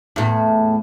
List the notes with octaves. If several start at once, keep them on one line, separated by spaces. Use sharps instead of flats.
E2 A2